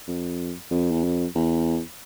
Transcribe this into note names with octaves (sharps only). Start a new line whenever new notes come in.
F2
F2
E2
F2
E2